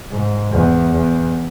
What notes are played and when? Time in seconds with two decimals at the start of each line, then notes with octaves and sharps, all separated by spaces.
0.10 G#2
0.51 E2
0.93 E2